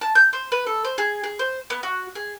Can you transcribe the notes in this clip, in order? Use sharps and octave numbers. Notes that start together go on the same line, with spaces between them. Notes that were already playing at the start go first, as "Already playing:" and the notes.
A5
G6
C5
B4
A4
C5
G#4
G#4
C5
B3
F#4
G#4